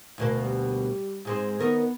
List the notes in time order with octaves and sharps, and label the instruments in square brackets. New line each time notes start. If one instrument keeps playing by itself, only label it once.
[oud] D2 B2 A#3
[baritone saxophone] G3
[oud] G#2 G#3 C4
[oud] D#3 A#4 D#5 [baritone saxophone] B3